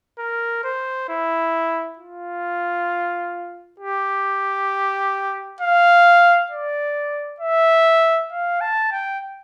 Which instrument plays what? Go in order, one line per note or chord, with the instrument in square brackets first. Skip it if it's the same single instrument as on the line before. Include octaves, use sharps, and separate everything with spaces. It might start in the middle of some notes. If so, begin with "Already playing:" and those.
[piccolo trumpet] A#4
C5
E4
F4
G4
F5
D5
E5
F5
A5
G5